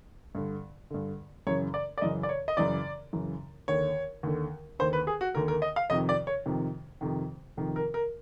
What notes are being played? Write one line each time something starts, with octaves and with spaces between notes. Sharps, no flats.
G2 D3
G2 D3
F#2 C#3 E3 C#5
D5
D5
F#2 C#3 E3 D#5
D5
C#5
D#5
F#2 C#3 E3 D5
F#2 C#3 E3
D#2 D3 C#5
D#2 D3
D#2 D3 C5
B4
G#4
F#4
D#2 D3 A#4
A#4
D#5
F5
F2 C3 D#3 D#5
D5
C#5
F2 C3 D#3
F2 C3 D#3
F2 C3 D#3
A#4
A#4